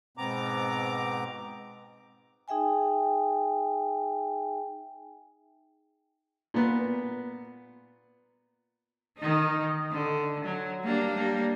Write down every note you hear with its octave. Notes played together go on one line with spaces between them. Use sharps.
G#2 B2 B3 C4 A#5 D6
D#4 G#4 E5 G5 G#5
A#2 B3
D#3 D#4
D3
F#3
G3 A#3 D4
G3 A#3